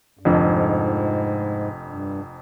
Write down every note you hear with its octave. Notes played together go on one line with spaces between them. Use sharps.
G2
F1 F2 G#2 D3 F3
G2